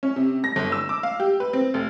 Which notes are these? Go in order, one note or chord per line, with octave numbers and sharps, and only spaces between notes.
C#4
C3
A#6
G1
E6
D6
F5
G4
B4
C4
F1